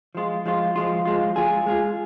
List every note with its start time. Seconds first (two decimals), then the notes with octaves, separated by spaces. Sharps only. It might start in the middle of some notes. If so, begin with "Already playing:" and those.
0.15 F3 G#3 F4
0.46 F3 G#3 F4
0.76 F3 G#3 F4
1.05 F3 G#3 F4
1.36 G#3 F4 G#4
1.67 G#3 F4 G#4